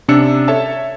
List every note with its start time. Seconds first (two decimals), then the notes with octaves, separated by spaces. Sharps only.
0.08 C3 C#4 D4 E6 C#7
0.48 A4 C#5 E5 A5